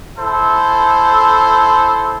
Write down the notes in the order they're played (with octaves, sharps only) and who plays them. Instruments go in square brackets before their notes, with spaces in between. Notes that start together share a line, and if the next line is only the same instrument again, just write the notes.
[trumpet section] E4 A4 C5